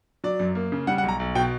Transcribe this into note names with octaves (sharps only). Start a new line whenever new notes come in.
F#3 D5
F#2
A#3
C#3
G3 F#5
F#5
B1
A#5
B1
B2 G5